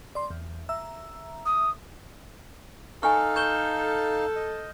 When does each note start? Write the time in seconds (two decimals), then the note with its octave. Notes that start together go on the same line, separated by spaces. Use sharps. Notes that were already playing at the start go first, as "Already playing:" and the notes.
0.15 D5 C6
0.30 E2
0.69 E5 A#5 E6
1.45 D#6
3.03 D#4 A4 F5 G#5 C#6 F6
3.36 C#6 G6 E7 G7
4.36 D#5